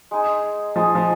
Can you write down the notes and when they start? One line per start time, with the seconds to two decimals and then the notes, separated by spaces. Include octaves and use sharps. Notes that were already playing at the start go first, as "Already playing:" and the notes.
0.11 G#3 D#4 G#4
0.76 F3 G#3 D#4 G#4
0.95 F3